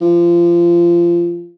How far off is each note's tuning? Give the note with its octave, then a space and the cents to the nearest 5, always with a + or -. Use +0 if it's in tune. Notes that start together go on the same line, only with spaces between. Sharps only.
F3 -25